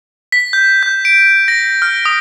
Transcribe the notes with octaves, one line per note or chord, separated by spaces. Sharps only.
B6
G6
G6
D7
A#6
F6
D#6